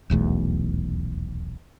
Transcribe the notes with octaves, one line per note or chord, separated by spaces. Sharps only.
D#1 B1 E2 A3